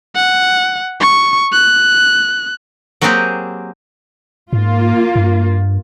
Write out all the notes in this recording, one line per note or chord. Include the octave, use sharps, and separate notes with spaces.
F#5
C#6
F#6
F#3 A#3 C4 G4 G#4 C5
G#2 A#3 F4
G2